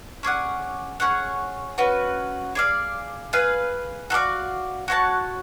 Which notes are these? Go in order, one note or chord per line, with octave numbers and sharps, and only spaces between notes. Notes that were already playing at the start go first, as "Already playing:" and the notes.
C#4 G#4 D5 F#5
C#4 G#4 C#5 F#5
C#4 F#4 B4
G#4 D5 F5
G#4 B4 F5
F#4 A4 D5 F5
F#4 C#5 F#5 A5